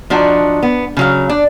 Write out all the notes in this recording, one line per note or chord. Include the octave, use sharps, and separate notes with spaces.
F3 D4 D#4 F#4
B3
C#3 F#3 F5
D4